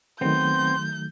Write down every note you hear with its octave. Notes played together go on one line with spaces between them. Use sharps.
D#3 F#3 A3 B3 C4 C6 G6